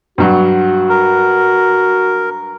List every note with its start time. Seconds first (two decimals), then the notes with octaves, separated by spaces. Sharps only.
0.18 G2 F#3 F#4
0.90 A#4